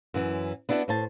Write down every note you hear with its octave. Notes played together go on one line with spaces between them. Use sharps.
F#2 E3
B3 D4 E4 F#4 E5
A2 C5 A5